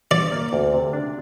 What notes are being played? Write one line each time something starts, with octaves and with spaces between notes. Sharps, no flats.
D4 D5
A#3
D2
C3
D4